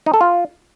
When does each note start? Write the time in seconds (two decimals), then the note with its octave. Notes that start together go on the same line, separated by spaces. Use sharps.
0.06 D#4
0.14 A4
0.21 F4